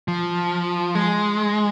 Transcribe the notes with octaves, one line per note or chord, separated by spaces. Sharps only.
F3
G#3